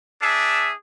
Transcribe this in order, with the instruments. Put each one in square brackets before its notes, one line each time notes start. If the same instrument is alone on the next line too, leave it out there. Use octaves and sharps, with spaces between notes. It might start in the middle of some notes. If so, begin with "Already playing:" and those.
[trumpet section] D4 G#4 E5